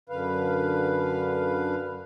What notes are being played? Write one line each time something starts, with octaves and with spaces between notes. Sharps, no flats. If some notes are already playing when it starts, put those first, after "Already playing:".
F#2 D3 B4 F5